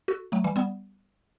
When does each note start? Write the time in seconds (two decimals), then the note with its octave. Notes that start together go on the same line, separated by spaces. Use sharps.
0.08 F#4 A4
0.32 F#3 A3
0.44 E3 G3
0.56 G3 B3